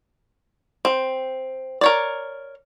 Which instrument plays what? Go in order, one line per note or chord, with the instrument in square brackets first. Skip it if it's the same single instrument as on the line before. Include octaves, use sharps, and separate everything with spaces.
[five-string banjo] C4
A#4 C#5 D5